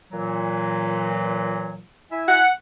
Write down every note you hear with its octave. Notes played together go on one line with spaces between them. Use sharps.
A#2 E3 F#3
E4 E5 G#5
F#5